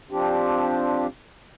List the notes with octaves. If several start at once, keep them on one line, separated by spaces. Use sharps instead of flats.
F3 C4 D4 G4